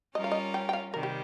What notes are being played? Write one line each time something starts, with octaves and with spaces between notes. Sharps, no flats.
G3 C#4 F4 A#4 D#5
F5
D#5
G5
G5
F5
C3 D#3 G3 A#4
G4